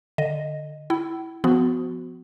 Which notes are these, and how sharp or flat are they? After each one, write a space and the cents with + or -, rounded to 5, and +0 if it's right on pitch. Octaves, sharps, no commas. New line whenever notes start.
D3 +15 D#5 +0
E4 +0 G5 -45
F3 +0 B3 +25 F#4 +0